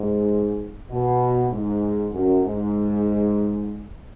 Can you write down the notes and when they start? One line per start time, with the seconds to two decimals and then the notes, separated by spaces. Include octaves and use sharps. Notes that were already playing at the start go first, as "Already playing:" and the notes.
Already playing: G#2
0.90 B2
1.50 G#2
2.12 F#2
2.43 G#2